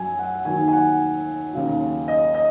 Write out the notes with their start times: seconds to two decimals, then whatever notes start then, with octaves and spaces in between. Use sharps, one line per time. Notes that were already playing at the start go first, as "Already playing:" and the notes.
Already playing: F#2 F#3 G#5
0.19 F#5
0.45 D#2 D#3 F#3 G#5
0.68 G#5
0.73 F#5
1.53 D#2 C#3 F#3
2.08 D#5
2.34 D#5